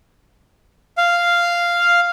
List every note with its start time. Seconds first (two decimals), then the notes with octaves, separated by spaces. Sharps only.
0.98 F5